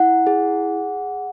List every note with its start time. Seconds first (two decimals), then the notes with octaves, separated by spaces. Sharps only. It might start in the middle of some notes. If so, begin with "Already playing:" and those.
Already playing: E4 F#5
0.27 G#4